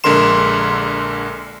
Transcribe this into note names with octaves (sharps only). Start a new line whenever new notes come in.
A#1 D3 G#3 A#4 C6 E7